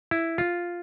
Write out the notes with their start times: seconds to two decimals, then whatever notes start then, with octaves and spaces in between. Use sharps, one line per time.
0.11 E4
0.38 F4